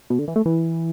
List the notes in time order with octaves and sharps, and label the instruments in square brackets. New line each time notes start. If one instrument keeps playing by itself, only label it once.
[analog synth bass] B2
D3
E3
A3
E3